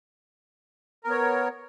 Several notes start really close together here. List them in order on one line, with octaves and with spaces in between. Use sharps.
A#4 B3 C#5